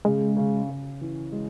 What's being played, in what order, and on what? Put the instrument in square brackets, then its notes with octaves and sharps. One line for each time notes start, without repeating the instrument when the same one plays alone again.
[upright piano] C#3 [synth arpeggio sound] G#3
[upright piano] C#3
C#3
E3
G#3